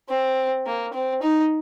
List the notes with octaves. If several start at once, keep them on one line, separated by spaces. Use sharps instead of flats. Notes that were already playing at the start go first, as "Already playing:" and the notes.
C4
A#3
C4
D#4